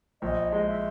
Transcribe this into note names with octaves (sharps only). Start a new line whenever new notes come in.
A#1 D#5
G#3
E5